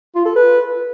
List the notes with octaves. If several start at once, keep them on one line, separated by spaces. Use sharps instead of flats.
F4
A4
B4